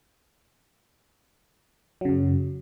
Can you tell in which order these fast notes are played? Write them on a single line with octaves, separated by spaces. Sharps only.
F#3 C#3 F#2